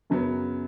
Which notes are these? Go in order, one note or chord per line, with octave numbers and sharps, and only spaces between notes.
F#2 C#3 F#3 B3